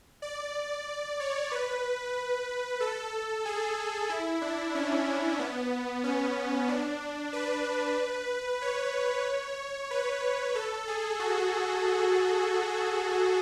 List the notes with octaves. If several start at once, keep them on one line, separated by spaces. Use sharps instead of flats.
D5
C#5
B4
A4
G#4
E4
D4
C#4
B3
C#4
D4
B4
C#5
B4
A4
G#4
F#4